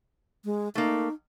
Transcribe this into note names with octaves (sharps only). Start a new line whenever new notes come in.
G#3
A3 A#3 D#4